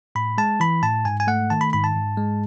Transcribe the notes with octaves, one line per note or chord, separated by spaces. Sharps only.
A2 B5
G#3 A5
E3 B5
A2 A5
G#2 G#5
G#5
A3 F#5
D#3 A5
B5
G#2 B5
A5
G#2
G#3